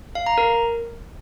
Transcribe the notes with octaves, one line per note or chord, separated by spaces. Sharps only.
F5
A#5
A#4